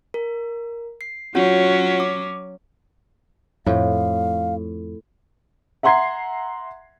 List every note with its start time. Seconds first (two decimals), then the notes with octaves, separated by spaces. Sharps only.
0.14 A#4
1.01 C7
1.35 F#3 C#4 F4 F#4 F#5
2.00 D6
3.66 F2 A2 F5
5.83 E5 F#5 A#5 C6 G#6 C7